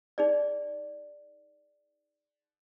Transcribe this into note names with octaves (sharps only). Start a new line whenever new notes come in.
D#4 G#4 D5